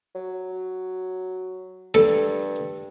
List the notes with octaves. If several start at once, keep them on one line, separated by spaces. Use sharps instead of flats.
F#3
G2 A4